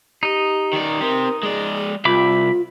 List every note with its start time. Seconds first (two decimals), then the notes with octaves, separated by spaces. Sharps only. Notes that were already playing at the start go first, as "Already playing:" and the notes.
0.23 D#4 G4 D#5
0.73 D#3 D5
1.01 C4 G4 A#4
1.43 G#3 G#4 D5
2.05 C2 F4 E5 B5 D6